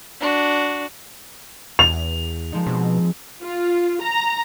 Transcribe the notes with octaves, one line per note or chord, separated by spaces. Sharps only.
D4 F#4
E2 F7
F3 G#3 D#4
B2 C4
F4
A#5